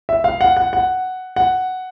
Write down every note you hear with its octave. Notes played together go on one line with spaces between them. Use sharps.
E5
F5
F#5
F#5
F#5
F#5